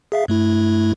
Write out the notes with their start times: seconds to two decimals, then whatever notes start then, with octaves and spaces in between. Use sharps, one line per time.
0.12 G#4 E5 F5
0.28 G2 A3 E4